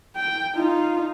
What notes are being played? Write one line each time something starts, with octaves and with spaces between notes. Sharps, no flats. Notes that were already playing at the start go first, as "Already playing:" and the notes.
G5
D#4 F4